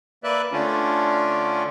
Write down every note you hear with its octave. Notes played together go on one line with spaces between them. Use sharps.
A#3 B4 D5 E5 F#6
D3 A3 C#4 D4 F4